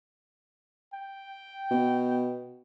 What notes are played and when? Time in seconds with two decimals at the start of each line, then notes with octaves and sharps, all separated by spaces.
0.94 G5
1.71 B2